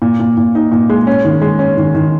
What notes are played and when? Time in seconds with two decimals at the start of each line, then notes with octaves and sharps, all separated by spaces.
0.02 A#2
0.20 A#2
0.37 A#2
0.55 D#4
0.72 A#2
0.90 G#3
1.07 C#4
1.25 D#3
1.42 G#3
1.59 C#4
1.77 D#3
1.94 D#3